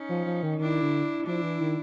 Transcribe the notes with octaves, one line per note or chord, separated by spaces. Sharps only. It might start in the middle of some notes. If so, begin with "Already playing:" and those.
Already playing: C#4 D#4
F3
F3
D#3
D#3 D4 E4
D3
F3 D4 E4
E3
D#3